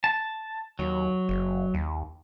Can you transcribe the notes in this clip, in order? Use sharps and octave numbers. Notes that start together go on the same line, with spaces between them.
A5
D#2 F#3
F#1
D#2